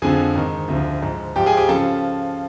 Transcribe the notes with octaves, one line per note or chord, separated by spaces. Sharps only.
F2 D3 F3 G#4 G#5
G#2 D#3
D2 D3 F3
G#2 F3
G#2 F3 G4 G5
G#4 G#5
G4 G5
C#3 F3 A4 A5